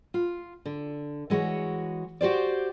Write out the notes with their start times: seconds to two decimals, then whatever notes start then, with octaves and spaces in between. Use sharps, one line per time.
0.14 F4
0.65 D3
1.30 E3 G#3 F#4 C#5
2.21 F#4 G4 C5 D5